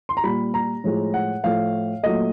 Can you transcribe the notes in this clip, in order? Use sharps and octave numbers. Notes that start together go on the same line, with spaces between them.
C6
A#5
A#2 G3 B5
A#5
A2 F3 G#3
F#5
A2 F3 A3 F5
A#2 F#3 A3 D#5